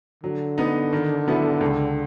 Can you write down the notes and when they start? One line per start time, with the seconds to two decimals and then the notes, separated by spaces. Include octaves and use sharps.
0.23 D3 F#3
0.58 B3 D#4
0.93 D#3
1.27 F#3 B3 E4 A4
1.61 C#2